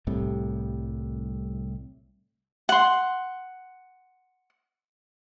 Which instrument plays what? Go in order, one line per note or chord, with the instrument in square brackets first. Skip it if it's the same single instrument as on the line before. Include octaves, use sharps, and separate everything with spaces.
[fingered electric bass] C2 A2 C3 G3
[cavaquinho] F#5 C6